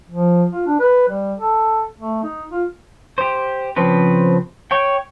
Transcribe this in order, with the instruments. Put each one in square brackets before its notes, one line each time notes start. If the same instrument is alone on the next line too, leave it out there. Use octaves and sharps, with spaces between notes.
[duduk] F3
F4
D4
B4
G3
A4
A3
D#4
F4
[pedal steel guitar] G4 C5
C#3 F3 C4 B4
C#5 G5